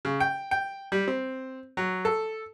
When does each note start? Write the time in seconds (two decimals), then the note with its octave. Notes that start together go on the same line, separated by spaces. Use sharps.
0.05 C#3
0.20 G5
0.51 G5
0.92 G3
1.08 C4
1.77 F#3
2.05 A4